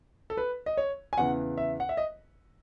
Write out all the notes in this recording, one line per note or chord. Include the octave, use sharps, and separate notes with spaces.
A4
B4
D#5
C#5
G#5
E2 C#3 E3 F#5
E5
F#5
E5
D#5